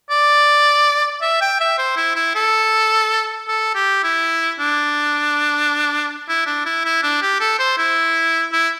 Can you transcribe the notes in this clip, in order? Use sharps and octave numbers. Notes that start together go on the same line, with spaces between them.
D5
E5
G5
E5
C5
E4
E4
A4
A4
G4
E4
D4
E4
D4
E4
E4
D4
G4
A4
C5
E4
E4